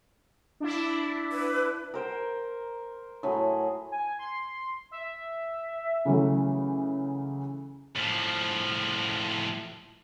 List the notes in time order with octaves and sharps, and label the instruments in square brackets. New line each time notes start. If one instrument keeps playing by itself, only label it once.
[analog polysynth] D4 E4
[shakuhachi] B4
[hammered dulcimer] A#4 C5 G5
A2 F#3 G#4
[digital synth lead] G#5
C6
E5
[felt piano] C#3 E3 F#3 A3
[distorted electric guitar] A2 F3